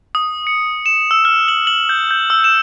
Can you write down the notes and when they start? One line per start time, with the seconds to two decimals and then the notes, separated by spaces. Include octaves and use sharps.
0.15 D#6
0.47 C#7
0.86 E7
1.11 E6
1.25 F6
1.48 F#7
1.67 F#7
1.89 G6
2.11 G6
2.30 E6
2.44 E7